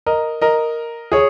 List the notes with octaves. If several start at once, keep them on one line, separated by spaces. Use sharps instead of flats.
A#4 D#5
A#4 D#5
G#4 C#5